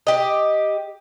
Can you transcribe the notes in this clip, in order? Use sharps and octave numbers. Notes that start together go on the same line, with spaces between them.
G4 D#5